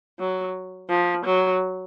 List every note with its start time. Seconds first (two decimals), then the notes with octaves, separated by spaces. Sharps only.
0.20 F#3
0.90 F3
1.25 F#3